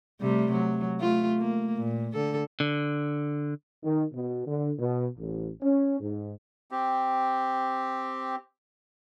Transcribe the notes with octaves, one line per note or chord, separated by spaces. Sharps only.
C3 G3 A3
F#3
A3 F4
A#3
A#2
D3 A4
D3
D#3
B2
D3
B2
A1
C#4
G#2
C4 G4